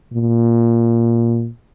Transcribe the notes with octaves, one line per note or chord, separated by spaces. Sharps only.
A#2